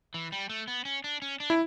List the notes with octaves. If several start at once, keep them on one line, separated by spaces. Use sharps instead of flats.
E3
G3
A3
B3
C#4
D4
C#4
D4
E4